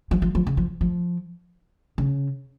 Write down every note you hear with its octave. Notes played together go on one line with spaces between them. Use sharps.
F3
F3
F3
C#3
F3
F3
C#3